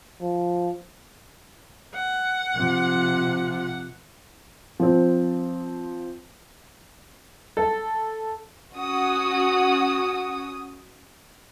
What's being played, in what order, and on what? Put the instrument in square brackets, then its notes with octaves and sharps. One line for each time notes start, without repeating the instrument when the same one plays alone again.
[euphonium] F3
[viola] F#5
[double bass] C3 F3
[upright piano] F3 C4
[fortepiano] A4
[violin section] C#4 F#4 D#6